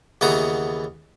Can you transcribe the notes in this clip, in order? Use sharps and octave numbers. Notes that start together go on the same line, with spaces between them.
D#2 C#3 E3 B3 A#5